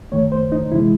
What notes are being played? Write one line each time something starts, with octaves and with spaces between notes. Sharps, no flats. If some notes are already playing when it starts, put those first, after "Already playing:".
F#2 D#3 A3 C#5
C5
D#4
C3 E3 G#3 E4